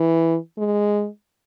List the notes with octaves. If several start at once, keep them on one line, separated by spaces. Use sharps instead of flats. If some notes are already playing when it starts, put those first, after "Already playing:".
Already playing: E3
G#3